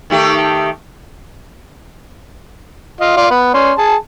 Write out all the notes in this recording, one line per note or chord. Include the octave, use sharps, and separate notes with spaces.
D#3 A3 G4
F4 D#5
F4 D5
B3 B5
C#4 D5 C6
G#4 A5